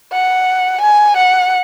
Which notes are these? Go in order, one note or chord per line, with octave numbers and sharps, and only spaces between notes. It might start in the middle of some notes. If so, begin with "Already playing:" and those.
F#5
G#5
F#5